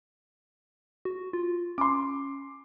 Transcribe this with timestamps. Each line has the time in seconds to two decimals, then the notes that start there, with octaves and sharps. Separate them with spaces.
1.05 F#4
1.33 F4
1.78 C#4 C6 D6